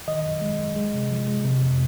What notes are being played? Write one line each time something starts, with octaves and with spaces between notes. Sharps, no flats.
D#3 D#5
F#2
G#3
F#2
G#3
C3
F3
G#3
C3
F2